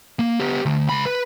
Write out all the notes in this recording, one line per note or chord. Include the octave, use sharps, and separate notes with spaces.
A#3
B3 G4
D3 A3
C#2 B5
B4